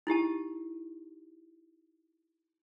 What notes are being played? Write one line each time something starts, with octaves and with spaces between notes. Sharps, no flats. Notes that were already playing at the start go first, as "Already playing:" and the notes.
D#4 E4 G4 A5